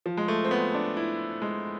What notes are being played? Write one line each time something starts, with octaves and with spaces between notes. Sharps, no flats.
F3
G#3
A3
C4
B3
D4
E4
G#3